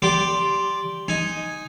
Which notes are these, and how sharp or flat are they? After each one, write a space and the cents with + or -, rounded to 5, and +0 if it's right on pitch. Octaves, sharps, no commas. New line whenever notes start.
G4 +0 D5 -10 C6 +0
D#4 +0 G#5 +0